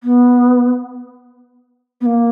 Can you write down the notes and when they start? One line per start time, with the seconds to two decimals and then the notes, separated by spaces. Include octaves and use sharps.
0.04 B3
2.01 B3
2.06 A#3